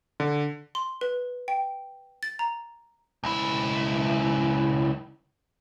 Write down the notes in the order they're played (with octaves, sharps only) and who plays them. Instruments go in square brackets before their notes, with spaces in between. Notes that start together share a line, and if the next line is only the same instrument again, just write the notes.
[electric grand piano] D3
[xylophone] C6
B4
G5
A6
A#5
[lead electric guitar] C#2 E4